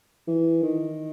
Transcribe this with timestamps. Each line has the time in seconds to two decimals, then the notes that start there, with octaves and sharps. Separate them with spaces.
0.28 E3
0.63 D#3